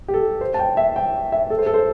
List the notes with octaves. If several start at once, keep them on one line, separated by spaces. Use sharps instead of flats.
G4
A4
C5
A5
G5
E5
G5
E5
A4
C5
A4
C5